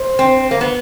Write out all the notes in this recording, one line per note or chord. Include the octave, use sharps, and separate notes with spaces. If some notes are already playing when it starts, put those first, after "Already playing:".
Already playing: C5
C4
A#3
B3